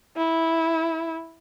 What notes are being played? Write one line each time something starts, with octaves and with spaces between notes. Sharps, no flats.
E4